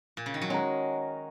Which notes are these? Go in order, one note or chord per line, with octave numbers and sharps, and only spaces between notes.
A#2
C#3
D#3
F#3
G#3 C#4 F#4 A#4